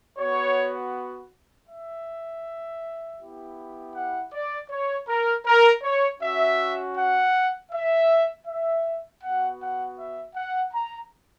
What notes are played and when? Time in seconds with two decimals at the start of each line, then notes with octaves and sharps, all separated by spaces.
0.18 B3 F#4 C#5
1.69 E5
3.20 B3 E4 G4
3.95 F#5
4.33 D5
4.70 C#5
5.09 A#4
5.46 A#4
5.83 C#5
6.21 C#4 F#4 E5
6.97 F#5
7.72 E5
8.47 E5
9.22 B3 F#4 F#5
9.60 F#5
9.97 E5
10.36 F#5
10.73 A#5